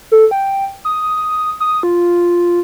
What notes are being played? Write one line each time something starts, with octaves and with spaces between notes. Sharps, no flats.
A4
G5
D#6
D#6
F4